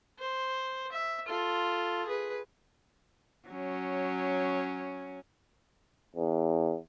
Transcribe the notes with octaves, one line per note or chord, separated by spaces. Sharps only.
C5
E5
F4 A4
G#4 B4
F#3 C#4
E2